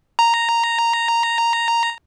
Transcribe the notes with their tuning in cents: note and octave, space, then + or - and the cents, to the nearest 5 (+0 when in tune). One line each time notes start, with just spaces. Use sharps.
A#5 -5